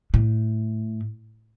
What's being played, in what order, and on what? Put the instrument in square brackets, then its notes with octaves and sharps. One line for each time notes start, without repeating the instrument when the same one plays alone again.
[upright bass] A2